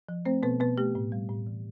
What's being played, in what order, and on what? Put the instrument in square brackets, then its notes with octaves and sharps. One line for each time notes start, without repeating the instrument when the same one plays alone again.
[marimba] F3
A3 C4 C5
B2 B3 B4
B2 B3 B4
A3 G4
A2
G3
A2
E3